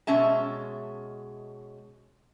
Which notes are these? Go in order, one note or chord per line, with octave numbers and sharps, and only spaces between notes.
B2 G#3 C#4 E5 A5